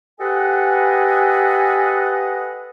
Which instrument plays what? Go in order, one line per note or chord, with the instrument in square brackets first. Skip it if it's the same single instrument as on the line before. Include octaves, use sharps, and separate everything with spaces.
[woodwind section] G4 A4 B4 D#5 F#5 G#5